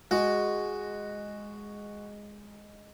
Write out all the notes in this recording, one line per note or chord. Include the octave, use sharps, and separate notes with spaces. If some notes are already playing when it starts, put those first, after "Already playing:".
G#3 F#4